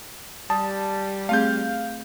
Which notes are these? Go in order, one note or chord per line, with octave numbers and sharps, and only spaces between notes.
G3 A5 D#6
A3 C4 G#4 F5 G6